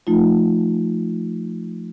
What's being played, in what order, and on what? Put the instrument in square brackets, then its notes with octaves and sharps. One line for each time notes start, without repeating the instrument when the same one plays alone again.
[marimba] F3 A3 D#4 F4